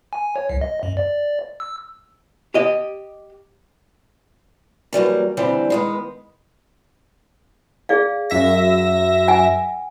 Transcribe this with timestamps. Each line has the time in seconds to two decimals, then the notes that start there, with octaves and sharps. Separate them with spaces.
0.13 G#5
0.36 C#5
0.49 C2
0.61 D#5
0.83 F#2
0.97 D5
1.60 E6
2.54 G4 D#5
4.93 E3 F#3 G3 A#3
5.37 D3 E3 G3 C4
5.70 D#3 G#3 B3
7.89 G#4 D5 F5
8.30 F#2 E5 A#6
9.28 F#5 G#5